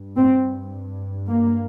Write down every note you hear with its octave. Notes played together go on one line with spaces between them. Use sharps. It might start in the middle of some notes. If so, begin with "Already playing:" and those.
Already playing: G2
C4
A#3